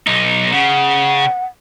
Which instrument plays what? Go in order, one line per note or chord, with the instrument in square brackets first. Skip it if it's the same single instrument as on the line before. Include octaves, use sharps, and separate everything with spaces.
[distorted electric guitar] B1 D#4
[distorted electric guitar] C#3 [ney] F#5